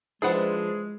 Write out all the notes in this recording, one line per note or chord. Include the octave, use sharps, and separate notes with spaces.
F3 G#3 D4 E4 G#4 B4 C5 F#5